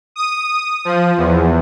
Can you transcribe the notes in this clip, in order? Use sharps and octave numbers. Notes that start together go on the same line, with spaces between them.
D#6
F3
E2